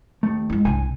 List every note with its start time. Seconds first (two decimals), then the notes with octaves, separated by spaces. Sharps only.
0.23 D#2 A3
0.50 G#3 E4
0.65 C2 D3 G#5